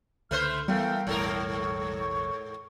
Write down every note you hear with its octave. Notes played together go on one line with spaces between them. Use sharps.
C#2 D3 A3 B4 C5 F6
E3 G3 A3 B3 A#4 F5 G5
E1 A1 G#2 A4 A#4 C#5 C#6